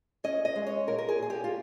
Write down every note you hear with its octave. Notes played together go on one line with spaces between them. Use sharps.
C#4 D#5
D#5
G#3
C#5
A#2 A#4
A#4
G#4
A#2 G#4
G4
F4